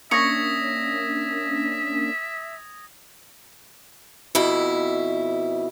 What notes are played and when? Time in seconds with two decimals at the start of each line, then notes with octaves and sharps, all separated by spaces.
0.11 A#3 C#4 D4 E5 C#6 D#6 G#6 A#6
4.35 F2 B2 E4